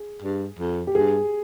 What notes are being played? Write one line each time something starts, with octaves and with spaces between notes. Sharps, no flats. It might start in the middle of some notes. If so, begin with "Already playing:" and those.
Already playing: G#4
G2
F2
G4
G2 G#4